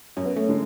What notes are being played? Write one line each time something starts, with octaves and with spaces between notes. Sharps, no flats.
F#2 C#4
B3
A3 C#4
D3 G#3